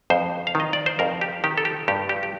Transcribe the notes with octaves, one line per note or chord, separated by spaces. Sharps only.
F2 C5
F5
D#3
D#5
D5
C5
F2 A#4
G4
D#3 G4
A4
G4
G2 G4
G4
G4